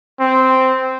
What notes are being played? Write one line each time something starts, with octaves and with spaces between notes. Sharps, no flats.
C4